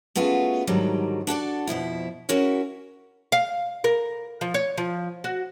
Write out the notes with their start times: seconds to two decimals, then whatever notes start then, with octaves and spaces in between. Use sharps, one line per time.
0.16 A3 B3 C#4 F4 F#4 G#4
0.67 G#2 D3 D#3 F#3 G3
1.27 D4 F#4 A4 D5
1.67 F2 B2 F3 E4
2.29 C#4 E4 F#4 A#4 C#5
3.32 F5
3.84 A#4
4.41 F3
4.54 C#5
4.78 F3
5.24 F#4